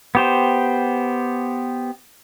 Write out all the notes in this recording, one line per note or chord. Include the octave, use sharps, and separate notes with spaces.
B3 G4 C5